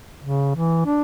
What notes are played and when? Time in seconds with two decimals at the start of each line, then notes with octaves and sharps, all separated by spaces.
0.23 C#3
0.55 E3
0.86 D4